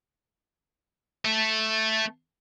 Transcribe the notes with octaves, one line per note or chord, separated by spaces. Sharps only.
A3